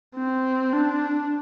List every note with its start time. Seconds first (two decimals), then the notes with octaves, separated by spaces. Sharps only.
0.16 C4
0.73 D4